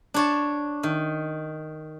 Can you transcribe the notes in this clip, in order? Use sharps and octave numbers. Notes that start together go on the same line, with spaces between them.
D4 C#5 A5
D#3